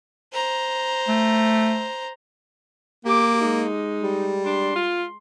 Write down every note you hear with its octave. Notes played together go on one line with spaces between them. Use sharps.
C5 A#5
A3
A#3 G4 D6
G#3 D#4
G3
D4 C6
F4